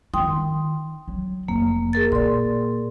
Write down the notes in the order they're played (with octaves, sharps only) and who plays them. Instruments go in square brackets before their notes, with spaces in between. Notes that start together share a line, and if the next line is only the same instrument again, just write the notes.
[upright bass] D#3 F4 [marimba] G5 C6 D#6
[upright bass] F#3
[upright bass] F1 [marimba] A#3
[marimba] G#4 A#4 A6
[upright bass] A#2 [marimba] D5 C6